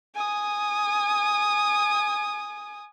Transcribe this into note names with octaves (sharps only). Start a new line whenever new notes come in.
G#5 D#6